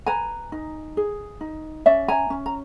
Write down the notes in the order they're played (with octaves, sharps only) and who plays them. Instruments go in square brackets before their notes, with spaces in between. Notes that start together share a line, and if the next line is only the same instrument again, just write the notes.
[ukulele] B4 G#5 A#5
D#4
G#4
D#4
C#4 D5 E5
G#5 A#5
C#4
A#5